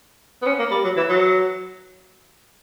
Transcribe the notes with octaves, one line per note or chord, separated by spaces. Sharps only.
B3
C#4
A#3
G3
F#3
E3
F#3